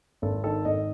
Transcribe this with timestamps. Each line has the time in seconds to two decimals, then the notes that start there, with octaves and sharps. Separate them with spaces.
0.22 G#1 A4
0.44 D#3 A4
0.65 G#1 D#5